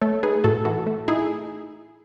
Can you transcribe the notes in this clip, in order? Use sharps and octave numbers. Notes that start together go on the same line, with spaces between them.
A3 A4 C#5
D#4 G#4 B4
A2 F#4 A4
E3 F#4 A4
A3
D#4 E4 G#4